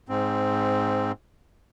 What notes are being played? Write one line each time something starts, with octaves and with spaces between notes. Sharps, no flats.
G#2 C4